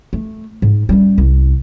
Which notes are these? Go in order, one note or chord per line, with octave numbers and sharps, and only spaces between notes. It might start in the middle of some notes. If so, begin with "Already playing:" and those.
A3
G#2
G3 C#4
C2